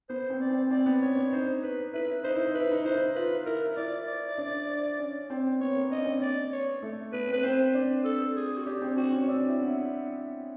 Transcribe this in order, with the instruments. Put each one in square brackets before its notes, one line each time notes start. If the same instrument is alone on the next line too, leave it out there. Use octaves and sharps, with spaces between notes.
[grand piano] B3 [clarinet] C5
[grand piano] C4
[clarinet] D5
[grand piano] C4
[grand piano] C4 [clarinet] D5
[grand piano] B3
[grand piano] C#4 [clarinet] C#5
[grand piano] D4
[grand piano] D#4 [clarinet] C5
[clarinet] B4
[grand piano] E4 [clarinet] B4
[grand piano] D#4 [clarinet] C5
[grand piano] E4
D#4
[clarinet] B4
[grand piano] E4
D#4
[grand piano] E4 [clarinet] C5
[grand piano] D#4
[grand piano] F4 [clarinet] B4
[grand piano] E4 [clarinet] A#4
[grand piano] E4 [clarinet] D5
[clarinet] D5
[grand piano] D4
C#4
C4
[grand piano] B3 [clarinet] C#5
[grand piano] A#3
[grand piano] D4 [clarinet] D#5
[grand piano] C#4
C4
[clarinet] D5
C#5
[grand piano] A3
[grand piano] B3 [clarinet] B4
[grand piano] C4 [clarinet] B4
[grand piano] C4 [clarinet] C5
[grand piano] D4
[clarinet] A4
G#4
F#4
[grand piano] D4 [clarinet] G4
[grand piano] C4
[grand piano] C4 [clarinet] F#4
[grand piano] C#4
[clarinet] C4 [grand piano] D4
[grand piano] E4
[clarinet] B3
[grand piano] E4